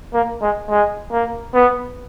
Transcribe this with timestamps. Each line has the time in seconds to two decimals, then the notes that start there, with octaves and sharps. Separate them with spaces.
0.14 A#3
0.42 G#3
0.70 G#3
1.12 A#3
1.54 B3